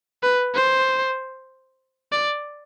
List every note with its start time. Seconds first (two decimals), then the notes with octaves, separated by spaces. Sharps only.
0.23 B4
0.55 C5
2.12 D5